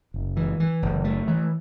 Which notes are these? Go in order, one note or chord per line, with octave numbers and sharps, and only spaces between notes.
F#1
E3
E3
F#1
A3
E3